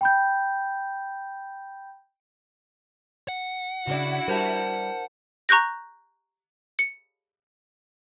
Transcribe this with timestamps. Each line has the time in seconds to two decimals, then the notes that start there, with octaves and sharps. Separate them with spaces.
0.01 G5 B5 G6
3.28 F#5
3.87 C#3 D4 E4 F#4 D5
4.28 G3 A#4 C5 A5
5.49 A#5 C#6 F#6 G6 A#6
6.79 C#7